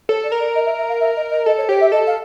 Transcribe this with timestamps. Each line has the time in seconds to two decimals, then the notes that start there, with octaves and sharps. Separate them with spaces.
0.09 A4 C#5
0.24 D5
0.32 A#4
0.40 D5
0.55 D#5
0.66 E5
0.77 E5
0.89 F5
1.00 E5
1.16 D#5
1.30 D#5
1.46 A4 D#5
1.58 C#5
1.69 G4 C#5
1.80 E5
1.92 A4 D#5
2.07 F5